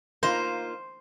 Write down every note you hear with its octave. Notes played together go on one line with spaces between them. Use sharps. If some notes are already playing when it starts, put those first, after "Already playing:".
A#3 D#4 F4 C5